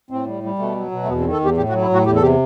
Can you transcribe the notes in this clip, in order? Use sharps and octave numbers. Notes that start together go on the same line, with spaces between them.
A2 C4
G3
G3
B2 A3
F#3
B2
A3
E2 B3
C4
D#3
A4
E2 G4
A2 G4
F#4
F#3
E4
A2 F#4
E2 G4
A4
C3 G4